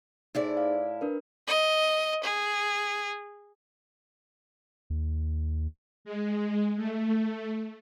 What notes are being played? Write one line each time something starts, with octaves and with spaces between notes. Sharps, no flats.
A2 D#4 E4 G#4 C5 D5
F5
D4 A#4 B4
D#5
G#4
D#2
G#3
A3